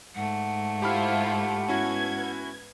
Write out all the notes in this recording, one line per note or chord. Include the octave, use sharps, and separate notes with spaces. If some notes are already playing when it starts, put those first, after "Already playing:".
G#2 A3 F#5
E4 F4 G4 C5 B5 F6
B3 C#4 E4 F#4 G#6